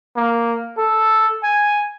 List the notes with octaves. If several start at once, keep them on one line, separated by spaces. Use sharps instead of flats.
A#3
A4
G#5